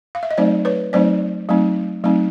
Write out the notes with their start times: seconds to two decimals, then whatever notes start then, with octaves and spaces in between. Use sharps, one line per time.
0.15 F5
0.23 E5
0.31 D#5
0.37 F#3 A3 C4 D#4 C5 D5
0.65 B4 C#5
0.93 F#3 A3 C4 D#4 C5 D5
1.49 F#3 A3 C4 D#4
2.04 F#3 A3 C4 D#4